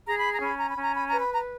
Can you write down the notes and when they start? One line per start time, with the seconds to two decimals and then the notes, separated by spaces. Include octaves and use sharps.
0.06 G#4 A#5
0.18 B5
0.32 A#5
0.41 C#4 B5
0.57 A#5
0.69 B5
0.76 C#4
0.82 A#5
0.94 B5
1.08 B4 A#5
1.20 B5
1.33 A#5